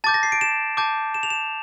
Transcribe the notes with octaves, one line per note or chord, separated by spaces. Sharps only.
A5 D6 G6 A6
A#6
C7
D7
E7
A5 D6 G6
E7
F7
E7